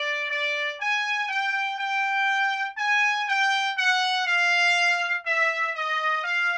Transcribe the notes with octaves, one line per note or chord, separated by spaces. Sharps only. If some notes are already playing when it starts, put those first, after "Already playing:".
Already playing: D5
D5
G#5
G5
G5
G#5
G5
F#5
F5
E5
D#5
F5